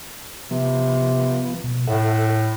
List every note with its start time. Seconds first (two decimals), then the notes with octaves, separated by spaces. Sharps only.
0.51 C3 F3 B3
1.64 B2
1.87 A2 A4 E5 F#5